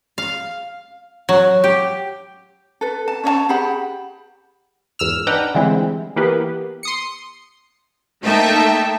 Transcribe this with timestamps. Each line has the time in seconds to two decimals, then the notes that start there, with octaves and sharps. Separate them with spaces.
0.18 F5
1.29 F#3
1.64 G4
2.81 A4 B4
3.08 A5
3.24 C#4 C#5 D#5 A5
3.49 G4 G#4 F#5 B5
4.99 G#1 E2 E6 F6
5.27 D4 D#4 B4 F#5 G5 A#5
5.54 D3 E3 G3 G#3 C4 E4
6.16 E3 A#3 B3 G4
6.83 C6 D#6 C#7
8.22 A3 A#3 D#4 E5 G5 A5